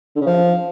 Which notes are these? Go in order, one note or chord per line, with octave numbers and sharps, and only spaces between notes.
D3
C#3
F3